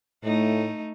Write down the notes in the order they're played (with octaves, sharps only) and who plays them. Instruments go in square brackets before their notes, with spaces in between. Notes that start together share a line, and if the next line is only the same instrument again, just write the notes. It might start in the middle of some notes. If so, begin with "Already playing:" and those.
[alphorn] A2 [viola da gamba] A3 D#4